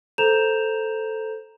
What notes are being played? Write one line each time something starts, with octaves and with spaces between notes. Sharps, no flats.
A4 C5 A#5 G6 E7 F7